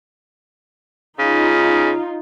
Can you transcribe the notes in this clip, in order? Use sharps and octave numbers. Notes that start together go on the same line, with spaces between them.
C#3 D#4 F4